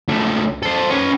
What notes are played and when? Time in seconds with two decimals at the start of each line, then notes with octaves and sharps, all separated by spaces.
0.08 C#2 A3
0.63 A4 C5
0.90 C#4 B4